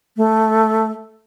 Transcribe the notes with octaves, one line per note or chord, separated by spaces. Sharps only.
A3